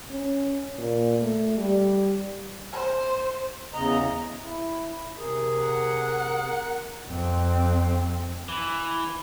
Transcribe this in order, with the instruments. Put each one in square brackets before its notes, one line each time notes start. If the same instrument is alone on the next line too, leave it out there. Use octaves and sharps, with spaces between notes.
[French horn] C#4
A#2
A3
G3
[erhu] C5
[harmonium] E2 C#3 D#5 [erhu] A#5
[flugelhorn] E4
[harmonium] C3 G#4 [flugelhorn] A#4
[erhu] F#5
[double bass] F2 C4
[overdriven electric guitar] E3